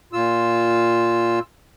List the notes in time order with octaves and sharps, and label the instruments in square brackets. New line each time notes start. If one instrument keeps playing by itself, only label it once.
[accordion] A#2 F4 E6